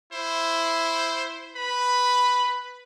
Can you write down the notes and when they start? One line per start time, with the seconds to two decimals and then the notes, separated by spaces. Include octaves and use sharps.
0.13 E4 C5
1.56 B4 B5